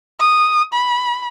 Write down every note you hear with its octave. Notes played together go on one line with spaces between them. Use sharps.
D#6
B5